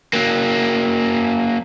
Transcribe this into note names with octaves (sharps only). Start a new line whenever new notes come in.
F#3 A#3